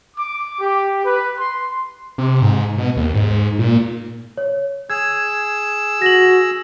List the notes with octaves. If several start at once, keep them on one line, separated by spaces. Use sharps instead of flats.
D6
G4
B4
C6
C3
G#2
B2
D#2
G#2
A#2
C#5
G#4 E6 G#6
F#4 A#6 F#7